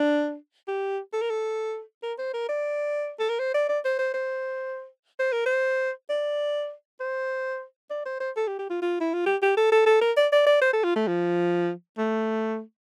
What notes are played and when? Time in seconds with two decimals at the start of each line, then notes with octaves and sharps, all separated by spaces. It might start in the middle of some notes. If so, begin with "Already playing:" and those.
Already playing: D4
0.68 G4
1.13 A4
1.21 A#4
1.30 A4
2.03 A#4
2.18 C5
2.34 A#4
2.49 D5
3.19 A4
3.29 A#4
3.39 C5
3.54 D5
3.69 D5
3.85 C5
3.99 C5
4.14 C5
5.19 C5
5.32 A#4
5.46 C5
6.10 D5
7.00 C5
7.90 D5
8.06 C5
8.20 C5
8.36 A4
8.47 G4
8.59 G4
8.70 F4
8.82 F4
9.01 E4
9.14 F4
9.26 G4
9.42 G4
9.57 A4
9.72 A4
9.86 A4
10.01 A#4
10.17 D5
10.32 D5
10.46 D5
10.61 C5
10.73 A4
10.84 F4
10.96 A3
11.07 F3
11.98 A3